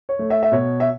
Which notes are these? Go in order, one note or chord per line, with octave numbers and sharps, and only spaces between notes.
C#5
A3
E5
E5
B2 C#5
E5